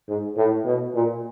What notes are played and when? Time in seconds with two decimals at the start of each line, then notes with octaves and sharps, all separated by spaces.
0.08 G#2
0.37 A2
0.65 B2
0.95 A#2